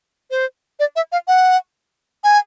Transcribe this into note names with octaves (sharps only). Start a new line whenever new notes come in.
C5
D5
E5
F5
F#5
G#5